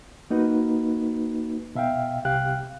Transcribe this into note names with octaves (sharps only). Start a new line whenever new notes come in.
A#3 D#4 F#4 B4
B2 E5 F5 G5
C2 C3 G4 F5 G5 F#6